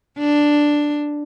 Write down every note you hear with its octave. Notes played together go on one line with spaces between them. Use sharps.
D4